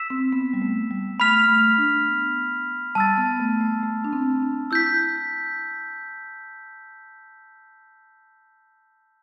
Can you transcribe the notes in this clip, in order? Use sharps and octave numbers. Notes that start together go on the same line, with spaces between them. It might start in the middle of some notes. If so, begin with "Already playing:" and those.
Already playing: E6 B6 E7
C4
B3
G3
A3
G3
A3 B5 F6 B6 F7
A3
D4
B3
G3 A5 E6 A6
B3
A3
A3
A3
D4
C4
D4
E4 E6 G6 B6